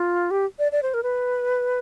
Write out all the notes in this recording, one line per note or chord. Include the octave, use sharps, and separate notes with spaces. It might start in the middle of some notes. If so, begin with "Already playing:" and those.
Already playing: F4
G4
D5
D5
C5
A#4
B4